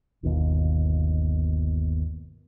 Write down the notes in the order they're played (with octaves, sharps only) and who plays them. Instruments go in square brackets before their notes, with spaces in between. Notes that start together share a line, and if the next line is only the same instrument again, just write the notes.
[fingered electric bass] G1 D#2 B2